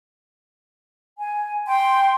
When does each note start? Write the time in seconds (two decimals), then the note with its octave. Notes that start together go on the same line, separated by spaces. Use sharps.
1.17 G#5
1.67 G5 C6